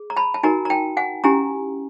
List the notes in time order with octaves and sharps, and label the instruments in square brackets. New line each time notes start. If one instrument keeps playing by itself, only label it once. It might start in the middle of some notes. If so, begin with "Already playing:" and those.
Already playing: [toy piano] G#4
A#5
A5 B5
A5
D#4 F#4 A#4 G#5 A#5
A#5
G5 A5
F#5 G#5
C#4 E4 G4 G#5 A#5